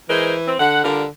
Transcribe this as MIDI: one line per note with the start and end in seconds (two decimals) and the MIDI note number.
0.10 0.54 52
0.10 0.36 56
0.10 0.36 70
0.10 0.36 72
0.48 0.56 60
0.60 0.82 50
0.60 0.81 78
0.84 1.06 50
0.84 1.03 55
0.84 1.03 65
0.84 1.03 70